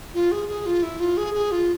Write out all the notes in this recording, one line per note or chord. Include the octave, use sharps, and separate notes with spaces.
F4
G#4
G#4
F4
E4
F4
G#4
G#4
F4